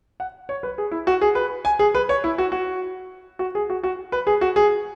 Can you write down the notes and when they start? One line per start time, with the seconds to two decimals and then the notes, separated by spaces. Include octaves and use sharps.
0.20 F#5
0.49 C#5
0.63 B4
0.78 G#4
0.91 E4
1.07 F#4
1.21 G#4
1.35 B4
1.65 G#5
1.79 G#4
1.95 B4
2.09 C#5
2.24 E4
2.38 F#4
2.52 F#4
3.39 F#4
3.55 G#4
3.70 F#4
3.84 F#4
4.12 B4
4.27 G#4
4.41 F#4
4.56 G#4